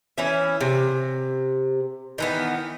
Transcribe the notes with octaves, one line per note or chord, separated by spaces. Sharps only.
E3 C#4 E5
C3
D#3 E3 B3